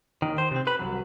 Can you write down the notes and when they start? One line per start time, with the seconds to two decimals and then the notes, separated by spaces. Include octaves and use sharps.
0.22 D#2 D#3
0.38 C5
0.51 C3 C4
0.67 B4 B5
0.79 C2 C3 F#3